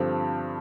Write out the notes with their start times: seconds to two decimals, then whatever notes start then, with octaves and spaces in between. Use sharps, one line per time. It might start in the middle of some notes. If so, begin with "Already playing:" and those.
Already playing: G2 D3 F3 C4 G4